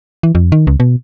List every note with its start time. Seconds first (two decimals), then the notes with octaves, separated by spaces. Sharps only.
0.23 E3
0.35 F2
0.52 D#3
0.67 C#2
0.80 B2